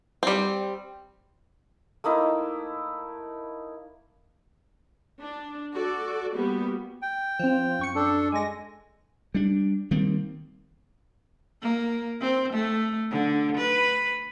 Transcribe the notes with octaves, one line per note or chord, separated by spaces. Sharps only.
G3 C4
A3 A#3 D#4 E4
D4
F#4 A4 D5
G3 A#3 B3 F#4
G5
F3 C4
F#2 C#6 C#7
D4 A4
G#3 G#5 A#6
G3 D4
D#3 G3 A#3 C4
A#3
C4
A3
D3
B4